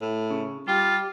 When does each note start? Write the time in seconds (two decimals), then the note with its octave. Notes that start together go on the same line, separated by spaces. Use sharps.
0.02 A2
0.31 C#3
0.68 G3 F4 G4